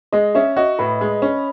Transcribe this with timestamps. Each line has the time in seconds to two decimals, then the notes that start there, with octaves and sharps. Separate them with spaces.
0.12 G#3 D#5
0.35 C#4 E5
0.56 F#4 D#5
0.79 A2 B4
1.01 G#3
1.22 C#4